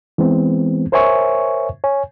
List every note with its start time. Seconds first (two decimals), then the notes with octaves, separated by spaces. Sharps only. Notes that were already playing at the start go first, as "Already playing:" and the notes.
0.18 E3 G#3 B3 C4
0.92 A#4 C5 C#5 E5 G#5 C#6
1.84 C#5 G#5